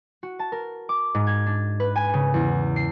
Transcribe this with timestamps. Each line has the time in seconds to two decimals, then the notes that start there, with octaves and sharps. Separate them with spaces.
0.23 F#4
0.39 A5
0.52 A#4
0.89 D6
1.15 G#2
1.27 G#6
1.46 D4
1.80 B4
1.96 G#5
2.14 C#3
2.34 E2
2.76 C7